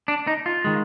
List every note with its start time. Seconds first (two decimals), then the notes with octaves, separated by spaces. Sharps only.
0.08 D4
0.27 D#4
0.46 F4
0.64 D#3 G#3